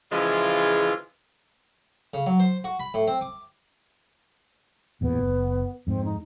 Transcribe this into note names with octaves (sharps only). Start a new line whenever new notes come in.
C#3 E3 F3 G#3 E4 F4
C#3
F#3
C5
F#4
B5
A2
C4
D6
A1 E2 A#2 B3
F#1
F2 G#2 C4
D#4